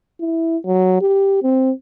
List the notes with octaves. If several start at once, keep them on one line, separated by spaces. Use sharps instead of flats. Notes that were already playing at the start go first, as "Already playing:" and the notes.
E4
F#3
G4
C4